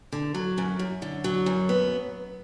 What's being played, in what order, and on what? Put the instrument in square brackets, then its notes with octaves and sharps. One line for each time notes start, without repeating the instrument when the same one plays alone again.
[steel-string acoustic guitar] D3
F#3
F#2
F#2
D3
F#3
F#2
B3